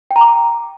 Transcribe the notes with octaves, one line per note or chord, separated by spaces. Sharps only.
G5
A#5
D6